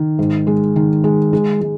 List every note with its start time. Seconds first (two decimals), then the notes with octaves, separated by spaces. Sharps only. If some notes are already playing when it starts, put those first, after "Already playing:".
Already playing: D#3
0.19 G#2
0.47 G#3
0.76 D#3
1.04 G#3
1.33 G#3
1.61 G#3